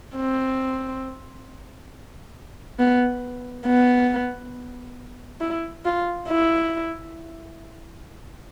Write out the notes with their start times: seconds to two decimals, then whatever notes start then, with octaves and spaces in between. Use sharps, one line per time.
0.16 C4
2.79 B3
3.66 B3
5.41 E4
5.85 F4
6.29 E4